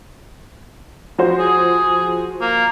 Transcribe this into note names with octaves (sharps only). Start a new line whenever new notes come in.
F3 F#4 C5
G#4
A#3